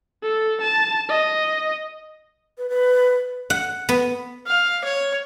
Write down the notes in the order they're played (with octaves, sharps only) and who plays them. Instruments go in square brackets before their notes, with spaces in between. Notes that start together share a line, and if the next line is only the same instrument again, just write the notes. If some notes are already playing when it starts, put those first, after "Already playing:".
[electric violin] A4
A5
D#5
[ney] B4
B4
[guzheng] F#5
B3
[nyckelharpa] F5
C#5